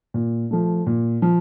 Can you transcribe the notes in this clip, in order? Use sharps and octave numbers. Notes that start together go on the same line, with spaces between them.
A#2
F3 A3
A#2
F3